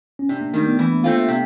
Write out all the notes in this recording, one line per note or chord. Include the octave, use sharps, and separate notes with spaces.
C#4
C3 D4
A#3
D#3 G3 A3
B3
E3
A3 C4 F4
C3